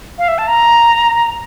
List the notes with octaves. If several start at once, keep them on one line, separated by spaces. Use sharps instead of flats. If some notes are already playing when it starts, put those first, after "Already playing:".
F5
E5
A5
A#5